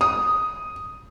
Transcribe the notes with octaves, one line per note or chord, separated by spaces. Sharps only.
D#6